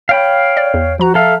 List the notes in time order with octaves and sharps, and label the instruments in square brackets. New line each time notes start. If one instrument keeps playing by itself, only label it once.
[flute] C#5 [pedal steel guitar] F5 G5 B5
[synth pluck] D5
E2
[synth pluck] F3 A#5 [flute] F#4
[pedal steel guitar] A4 F5 [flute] E5